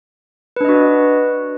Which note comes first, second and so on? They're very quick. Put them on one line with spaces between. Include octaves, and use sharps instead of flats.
B4 D4 D#5 F#4